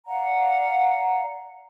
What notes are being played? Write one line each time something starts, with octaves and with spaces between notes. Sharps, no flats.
D5 F5 F#5 A#5